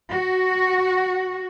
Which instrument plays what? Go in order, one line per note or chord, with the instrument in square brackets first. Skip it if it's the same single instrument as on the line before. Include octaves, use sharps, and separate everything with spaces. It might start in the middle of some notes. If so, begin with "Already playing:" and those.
[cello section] F#4